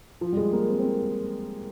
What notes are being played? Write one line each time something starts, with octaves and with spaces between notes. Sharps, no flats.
F3
G3
G#3
A#3
C4
C4
A#3